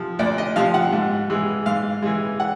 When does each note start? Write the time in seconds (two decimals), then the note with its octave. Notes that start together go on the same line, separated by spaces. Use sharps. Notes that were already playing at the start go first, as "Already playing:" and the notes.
Already playing: C3 F3
0.19 D2 D5
0.38 D#5
0.56 C3 F3 F5
0.74 F#5
0.92 G#2
1.30 E3 G#3
1.66 G#2 F5
2.02 E3 G#3
2.40 F#5